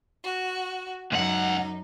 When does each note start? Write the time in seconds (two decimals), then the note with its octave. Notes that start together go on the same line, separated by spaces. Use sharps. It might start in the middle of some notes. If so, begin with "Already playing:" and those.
0.23 F#4
1.12 C#2 F#2 D#4 F#5